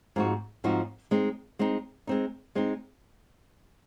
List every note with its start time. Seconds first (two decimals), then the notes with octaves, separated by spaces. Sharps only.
0.16 G#2 F3 C4 D#4 F#4
0.64 G#2 F3 C4 D#4 F#4
1.11 G#3 C4 D#4
1.59 G#3 C4 D#4
2.07 G#3 C4 D#4
2.55 G#3 C4 D#4